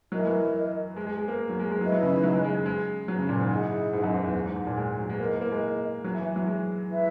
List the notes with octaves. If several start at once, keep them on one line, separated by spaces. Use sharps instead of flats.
F#3 E4 A#4 D#5
E3
F#3
G#3
G#3
G#3
A#3
F#3
G#3
G#3
F#3 E4 B4 D#5
F#3
C#3
D#3
F#3
G#3
G#3
G#3
G#3
F#3
C#3
A#2
G#2
E4 G#4 D#5 F#5
G#2
F#2
G#2
E2
G#2
G#2
A#2
G#3
F#3
G#3
A#3 E4 A#4 D#5
A#3
G#3
F#3
E3
E3
F#3
G#3
E4 B4 E5